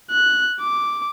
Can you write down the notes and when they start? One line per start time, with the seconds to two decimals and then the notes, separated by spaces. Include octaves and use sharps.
0.11 F#6
0.61 D6